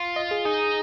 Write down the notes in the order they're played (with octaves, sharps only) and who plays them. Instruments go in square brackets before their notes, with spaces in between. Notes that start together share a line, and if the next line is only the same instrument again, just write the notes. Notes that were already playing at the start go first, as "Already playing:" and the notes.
Already playing: [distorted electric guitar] F4
[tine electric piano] D#5
G#4
[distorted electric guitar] D#4 [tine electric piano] G#4